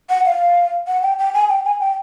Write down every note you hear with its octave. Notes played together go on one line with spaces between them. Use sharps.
F#5
F5
F#5
G5
G5
G#5
G5
G#5
G5